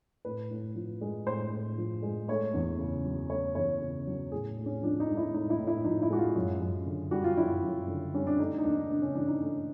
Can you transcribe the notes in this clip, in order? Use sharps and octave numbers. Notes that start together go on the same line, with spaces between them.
A2 B4
A2
F3
G#3
A2 C5
A2
F3
G#3
A3 C#5
E2
C#3
F#3
A3 C#5
E2 C#5
C#3
F#3
A2 G#4
A2
C#4
F3 D4
D#4
G#3
E4
A2 D#4
E4
A2
E4
F3 D#4
E4
G#3 F#4
F4
F#2
F#2
D3
G3 F#4
F4
F#2 E4
F#2
D3
G3 C#4
D4
A3 D#4
D#4
D#2 D4
C#3 D4
C#4
E3 D4
D#4
A3